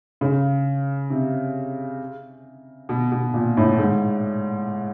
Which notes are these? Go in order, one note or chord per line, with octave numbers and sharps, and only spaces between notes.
C#3
C3
B2
B2
A#2
A2
G#2